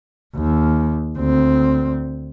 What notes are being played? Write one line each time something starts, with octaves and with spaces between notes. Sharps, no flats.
D#2
D2 C4